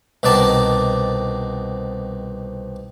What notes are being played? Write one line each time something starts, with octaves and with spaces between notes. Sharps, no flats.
C2 B2 D#3 D5 A5